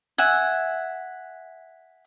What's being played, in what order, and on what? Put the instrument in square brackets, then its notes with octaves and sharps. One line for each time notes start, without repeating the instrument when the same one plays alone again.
[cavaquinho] E5 F#5 G#5